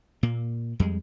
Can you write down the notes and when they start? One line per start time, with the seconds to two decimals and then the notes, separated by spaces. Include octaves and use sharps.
0.23 A#2 A#3
0.80 F2 G3 G#3